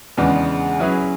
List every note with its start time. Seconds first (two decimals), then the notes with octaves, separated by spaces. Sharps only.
0.17 E2 C#3 G#3 B3 D4
0.79 F#3 C#4 E4 G#4 B4